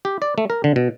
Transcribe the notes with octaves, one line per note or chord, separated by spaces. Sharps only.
G4
D5
A3
A#4
D3
B2